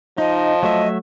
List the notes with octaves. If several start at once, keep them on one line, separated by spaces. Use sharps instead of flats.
F3 D#4 D#5
F#3 A3 D#5 E5